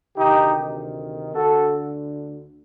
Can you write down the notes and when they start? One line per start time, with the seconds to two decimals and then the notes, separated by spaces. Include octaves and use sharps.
0.17 D2 C3 D#3 D#4 G4
1.34 D2 D3 F#4 A4